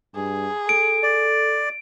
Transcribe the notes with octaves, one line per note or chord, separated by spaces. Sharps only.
G2 G#4
A4 D7
D5